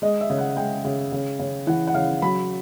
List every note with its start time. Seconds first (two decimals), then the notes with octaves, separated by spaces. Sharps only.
0.02 G#3 D#5
0.21 E5
0.30 C#3
0.38 F#5
0.57 G#3 G5
0.85 C#3
1.12 C#3
1.39 C#3
1.67 E3 F#5
1.87 F#5
1.94 C#3 F5
2.22 F#3 B5